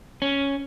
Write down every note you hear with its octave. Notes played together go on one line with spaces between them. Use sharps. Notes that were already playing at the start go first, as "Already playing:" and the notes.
C#4